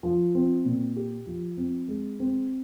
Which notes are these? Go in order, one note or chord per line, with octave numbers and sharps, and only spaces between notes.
F3
C4
A#2
G4
F3
C4
G#3
C4